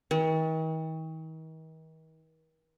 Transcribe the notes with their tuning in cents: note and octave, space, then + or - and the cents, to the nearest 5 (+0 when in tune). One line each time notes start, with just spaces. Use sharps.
D#3 +45